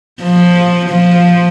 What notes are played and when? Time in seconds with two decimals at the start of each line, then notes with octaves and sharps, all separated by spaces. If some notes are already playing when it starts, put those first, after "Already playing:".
0.22 F3
0.89 F3